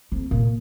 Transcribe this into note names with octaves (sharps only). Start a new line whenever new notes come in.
F2
A#2